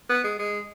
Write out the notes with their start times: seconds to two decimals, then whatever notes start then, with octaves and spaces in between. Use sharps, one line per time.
0.09 B3
0.24 G#3
0.39 G#3